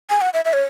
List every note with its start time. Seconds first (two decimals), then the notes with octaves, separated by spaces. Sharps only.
0.10 G#5
0.21 F#5
0.34 E5
0.45 E5
0.53 C#5